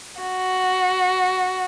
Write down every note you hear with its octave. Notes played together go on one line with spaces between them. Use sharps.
F#4